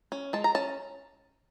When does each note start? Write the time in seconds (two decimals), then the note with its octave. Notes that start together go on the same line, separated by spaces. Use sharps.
0.12 C#4
0.33 G#3 A5
0.44 A#5
0.55 C#4 A5